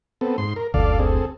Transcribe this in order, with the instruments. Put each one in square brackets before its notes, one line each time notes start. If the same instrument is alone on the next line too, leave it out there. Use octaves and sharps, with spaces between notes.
[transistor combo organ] B3 C4 A4
G#2 C6
A#4
[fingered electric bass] F#1 D2 D3 [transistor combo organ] A4 D5 F5
[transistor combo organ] C4 G#4 A4